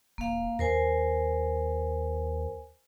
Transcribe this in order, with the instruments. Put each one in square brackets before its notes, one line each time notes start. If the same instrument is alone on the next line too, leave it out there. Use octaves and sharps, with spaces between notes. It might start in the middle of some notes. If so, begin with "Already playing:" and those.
[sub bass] E1 [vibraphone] A#3 F5
[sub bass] D#2 [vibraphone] A#4 C5 G#5